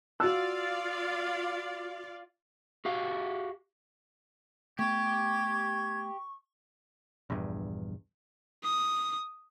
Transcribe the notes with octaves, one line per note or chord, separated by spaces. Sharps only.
F4 F#4 D5 F5 E6
F#4 G4 F5
A3 B3 G4 C#6 G#6
A#1 E2 G2
D#6